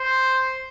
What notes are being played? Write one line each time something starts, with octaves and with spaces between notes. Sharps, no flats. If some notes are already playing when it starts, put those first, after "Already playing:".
Already playing: C5